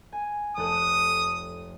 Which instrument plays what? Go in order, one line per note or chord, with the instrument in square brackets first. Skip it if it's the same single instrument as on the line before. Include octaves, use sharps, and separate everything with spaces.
[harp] G#5
[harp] F1 A4 F#6 [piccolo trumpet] D#6